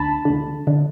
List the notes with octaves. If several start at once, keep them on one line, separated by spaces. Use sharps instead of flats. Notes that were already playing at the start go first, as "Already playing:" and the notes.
Already playing: D2 D3 A5 B5
D2 D3
D3